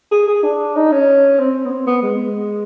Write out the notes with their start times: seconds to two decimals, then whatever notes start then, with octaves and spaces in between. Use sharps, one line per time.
0.12 G#4
0.28 G#4
0.44 D4
0.76 D#4
0.92 C#4
1.39 C4
1.65 B3
1.71 C4
1.87 B3
2.03 G#3